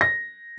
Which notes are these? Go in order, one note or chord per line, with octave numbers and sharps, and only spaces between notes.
A#6